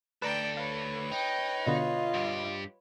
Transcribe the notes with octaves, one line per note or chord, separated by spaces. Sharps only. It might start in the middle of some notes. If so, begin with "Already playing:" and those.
D2 A4 B4 D5 G5 A#5
B4 C#5 F5
D#4 G5
B2 D3 B3 F4 D#5
G2 G4